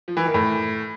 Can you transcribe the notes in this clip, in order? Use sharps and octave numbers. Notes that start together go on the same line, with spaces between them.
F3
E3
D#3
A2